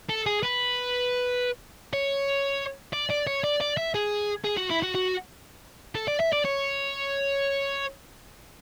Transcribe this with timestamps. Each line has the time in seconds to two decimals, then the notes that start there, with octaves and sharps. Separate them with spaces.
0.09 A4
0.26 G#4
0.43 B4
1.93 C#5
2.93 D5
3.10 D5
3.27 C#5
3.44 D5
3.61 D5
3.77 E5
3.95 G#4
4.44 G#4
4.57 F#4
4.70 E4
4.82 F#4
4.95 F#4
5.95 A4
6.08 D5
6.20 E5
6.33 D5
6.45 C#5